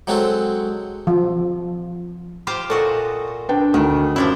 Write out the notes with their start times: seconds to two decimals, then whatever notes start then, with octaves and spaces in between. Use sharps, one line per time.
0.07 F#3 G#3 C4 F#4 A4
1.07 F3
2.47 F4 G4 C5
2.70 A#2 F#4 A4 D#5
3.49 D4 B4 G5
3.74 D2 D#3
4.16 F#2 F3 D4 E4